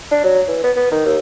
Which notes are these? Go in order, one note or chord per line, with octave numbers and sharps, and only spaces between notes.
D4
F#3
E3
B3
B3
D#3
D#2